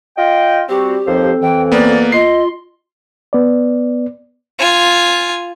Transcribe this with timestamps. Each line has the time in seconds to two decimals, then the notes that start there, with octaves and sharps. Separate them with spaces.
0.17 F4 D#5 G5
0.69 G3 C4 F#4 G4
1.06 D#2 F3 C4 A4 C5
1.42 F2 E3 G5
1.72 A#3 B3 D5
2.12 F4 D#5 C6 C7
3.33 B3 D5
4.59 F4 G#5